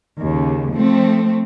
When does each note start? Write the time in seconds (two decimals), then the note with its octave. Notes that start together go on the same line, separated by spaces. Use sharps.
0.21 D#2 C#3
0.72 F3 A3 C4